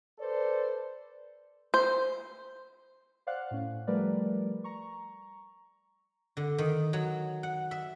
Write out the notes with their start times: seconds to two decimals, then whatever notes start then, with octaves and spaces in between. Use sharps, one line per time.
0.20 A4 B4 C5 D5
1.74 C5
3.27 C5 D5 F5 F#5 F#6
3.51 A2 C#4
3.87 F3 G3 A3 A#4 B4 D5
4.64 A#5 C#6
6.37 D3
6.58 D#3
6.93 F#3
7.43 F#5
7.71 E5